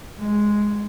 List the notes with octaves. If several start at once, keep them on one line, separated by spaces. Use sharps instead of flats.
G#3